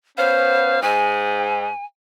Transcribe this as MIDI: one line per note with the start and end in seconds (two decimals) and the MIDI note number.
0.18 0.78 59
0.18 0.78 61
0.18 0.80 72
0.18 0.78 77
0.82 1.67 44
0.82 1.85 80